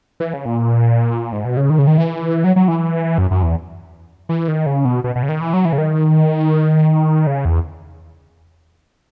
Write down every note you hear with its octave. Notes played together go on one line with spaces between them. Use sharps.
E3
C#3
A#2
G#2
B2
C#3
D#3
C#3
D#3
E3
F#3
F#3
E3
F#2
F#2
E2
E3
D#3
C#3
B2
B2
B2
C#3
D#3
E3
F#3
E3
C#3
D#3
C#3
E2